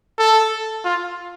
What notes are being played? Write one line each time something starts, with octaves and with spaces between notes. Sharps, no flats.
A4
F4